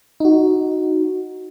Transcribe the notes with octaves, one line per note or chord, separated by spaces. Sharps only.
D#4 F#4